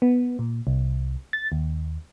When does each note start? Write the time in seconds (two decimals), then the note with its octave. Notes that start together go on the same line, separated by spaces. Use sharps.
0.02 B3
0.39 A#2
0.67 C2
1.33 A6
1.52 D#2